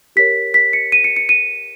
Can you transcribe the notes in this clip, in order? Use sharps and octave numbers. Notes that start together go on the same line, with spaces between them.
G4 A#4 C#5 B6
B6
C#7
D#7
C#7
C#7
D#7